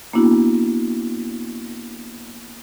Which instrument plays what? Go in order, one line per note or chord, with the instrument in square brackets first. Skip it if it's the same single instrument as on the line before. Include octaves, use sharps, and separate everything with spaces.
[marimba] A#3 B3 D4 E4 F#4